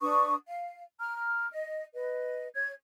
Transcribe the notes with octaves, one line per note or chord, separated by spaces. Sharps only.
D4 B4 C#6 D#6
F5
A#5 F6
D#5
B4 D#5
C#5 G#6